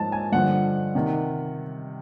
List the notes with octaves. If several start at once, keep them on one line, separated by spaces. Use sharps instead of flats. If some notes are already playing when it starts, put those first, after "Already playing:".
Already playing: G#2 F3 A5
G#5
G2 D3 F3 F#5
C3 D#3